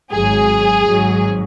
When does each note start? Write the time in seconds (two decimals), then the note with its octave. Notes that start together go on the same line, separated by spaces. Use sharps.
0.12 G#1 G#2 F#3 G#4
0.84 G#1 G#2 F#3